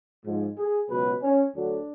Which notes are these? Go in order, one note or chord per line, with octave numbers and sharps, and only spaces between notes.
G#2 F3
G#4
C#2 B2 F#3 B4
C#4
D2 D3 F#3 D4